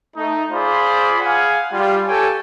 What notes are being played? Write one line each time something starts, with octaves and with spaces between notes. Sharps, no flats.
A3 D#4
F4 G#4 C5 D5 B5
G#4 F5 F#5 G#5
G3 F4
G4 A4 C#5 G5 G#5